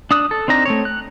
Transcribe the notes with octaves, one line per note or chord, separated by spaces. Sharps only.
D4 D#6 F#6
A4
C4 D4 D#4 A#5
A3 C4 C#5
F#6